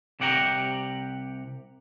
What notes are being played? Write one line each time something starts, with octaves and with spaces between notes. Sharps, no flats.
C2 C3 G4 F#5 G5 A#5